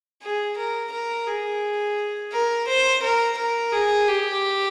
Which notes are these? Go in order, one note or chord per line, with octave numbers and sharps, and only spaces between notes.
G#4
A#4
A#4
G#4
A#4
C5
A#4
A#4
G#4
G4